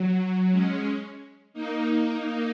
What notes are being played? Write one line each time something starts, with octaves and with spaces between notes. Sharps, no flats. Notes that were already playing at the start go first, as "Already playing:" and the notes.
Already playing: F#3
G#3 C#4
A#3 D#4
A#3 D#4